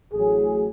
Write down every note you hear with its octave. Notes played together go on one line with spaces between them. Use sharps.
A1 A2 F#3 G#4